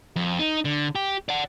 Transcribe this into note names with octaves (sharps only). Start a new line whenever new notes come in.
F2
D#4
D3
G4
D5 F#5